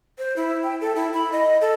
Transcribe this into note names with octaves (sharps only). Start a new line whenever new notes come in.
C5
E4
G5
A4
E4
B5
D#5
A4